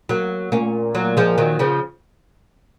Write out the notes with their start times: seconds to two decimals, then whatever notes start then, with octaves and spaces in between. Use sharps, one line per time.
0.09 F#3 A#3
0.52 A#2 A#3 C#4
0.95 F#3 A#3
1.17 F3 G#3
1.38 D#3 F#3
1.59 C#3 F3